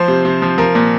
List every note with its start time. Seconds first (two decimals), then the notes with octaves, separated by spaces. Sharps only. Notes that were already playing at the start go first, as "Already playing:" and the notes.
Already playing: F3 C5
0.08 C3
0.25 C3
0.42 F3
0.58 F3 A#4
0.75 A#2